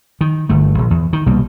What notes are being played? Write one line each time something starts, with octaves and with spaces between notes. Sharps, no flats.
D#3
G1 A3
A#1
E2
D#3
C2 B2 G3 A#3